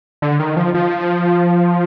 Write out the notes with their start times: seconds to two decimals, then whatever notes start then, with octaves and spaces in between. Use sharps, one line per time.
0.22 D3
0.39 D#3
0.57 F3
0.74 F3